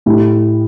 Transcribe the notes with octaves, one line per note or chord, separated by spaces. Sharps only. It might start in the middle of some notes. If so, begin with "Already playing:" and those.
A2 A3 E4 G4